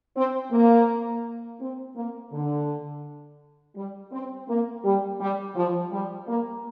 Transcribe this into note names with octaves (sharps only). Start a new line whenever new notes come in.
C4
A#3
C4
A#3
D3
G3
C4
A#3
G3
G3
F3
G3
A#3